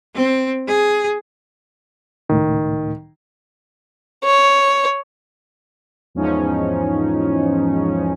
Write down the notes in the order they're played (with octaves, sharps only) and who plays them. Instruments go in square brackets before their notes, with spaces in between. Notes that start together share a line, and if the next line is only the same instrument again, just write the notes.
[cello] C4
G#4
[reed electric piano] C#2 A2 [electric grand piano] D#3
[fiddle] C#5
[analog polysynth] E2 G#2 F3 C#4 D#4